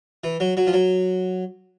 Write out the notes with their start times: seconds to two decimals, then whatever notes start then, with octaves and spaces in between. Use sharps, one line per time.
0.24 E3
0.40 F#3
0.57 F#3
0.67 F3
0.73 F#3